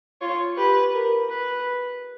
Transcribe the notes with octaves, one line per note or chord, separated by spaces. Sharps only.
F4 C#5
G4 B4
A#4
B4